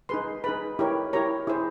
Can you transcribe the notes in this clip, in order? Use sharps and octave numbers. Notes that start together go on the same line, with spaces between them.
D#4 G#4 B4 C6
D#4 G#4 B4 B5
E4 G4 A#4 C#5
E4 G4 A#4 C#5 A#5
E4 G#4 C5